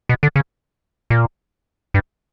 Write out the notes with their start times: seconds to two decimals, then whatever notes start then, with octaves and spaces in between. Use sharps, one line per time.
0.09 B2
0.23 D3
0.36 C#3
1.10 A#2
1.94 G2